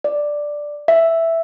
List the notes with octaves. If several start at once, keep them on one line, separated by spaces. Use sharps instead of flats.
D5
E5